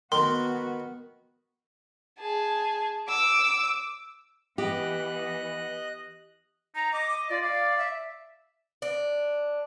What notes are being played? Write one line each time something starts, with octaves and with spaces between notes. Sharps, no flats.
D#3 B3 F#4 C6
G#4 A5
D6 E6
E3 B3 G4 D#5 F#6
D#4 A#5
D#5 D6
F4 D5
D5 F5
E5
D4